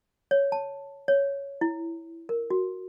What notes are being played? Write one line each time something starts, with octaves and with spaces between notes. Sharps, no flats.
C#5
A5
C#5
E4
A#4
F#4